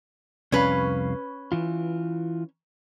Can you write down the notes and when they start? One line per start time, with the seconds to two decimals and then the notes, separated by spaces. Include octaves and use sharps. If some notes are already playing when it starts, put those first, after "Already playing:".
0.52 C2 F2 C#4 B4 F5
1.52 E3 F4